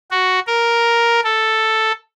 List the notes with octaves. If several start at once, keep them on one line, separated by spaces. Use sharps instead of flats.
F#4
A#4
A4